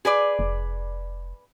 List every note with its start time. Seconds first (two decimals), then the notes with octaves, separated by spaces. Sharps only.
0.05 G#4 B4 D5
0.39 F1